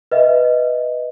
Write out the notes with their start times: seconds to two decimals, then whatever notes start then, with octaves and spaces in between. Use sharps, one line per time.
0.12 B4 D#5 E5